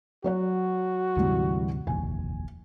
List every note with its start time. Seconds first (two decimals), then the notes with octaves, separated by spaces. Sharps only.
0.24 F#3 F#4 C#5 F#5
1.17 D2 G#2 C3 E3 G3
1.87 F1 A#1 D#2 G#5